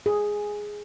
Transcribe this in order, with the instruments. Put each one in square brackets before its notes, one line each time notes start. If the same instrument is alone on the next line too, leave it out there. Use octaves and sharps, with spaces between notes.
[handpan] G#4